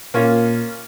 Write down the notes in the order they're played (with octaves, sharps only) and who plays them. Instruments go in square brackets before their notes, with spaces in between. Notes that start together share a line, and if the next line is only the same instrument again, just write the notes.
[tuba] A#2 [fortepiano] A#3 C#4 F4